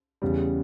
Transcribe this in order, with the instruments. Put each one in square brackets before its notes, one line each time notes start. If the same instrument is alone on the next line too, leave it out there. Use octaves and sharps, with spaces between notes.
[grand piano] E2 C#3 G3